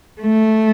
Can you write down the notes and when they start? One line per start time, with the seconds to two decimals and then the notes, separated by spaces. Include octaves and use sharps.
0.21 A3